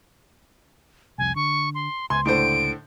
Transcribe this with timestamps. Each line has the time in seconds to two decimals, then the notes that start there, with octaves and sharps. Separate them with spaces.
1.18 C2 F2 G#5
1.36 D3 C#6
1.75 C6
2.10 C#2 G#5 C6
2.25 A2 D3 C5 D7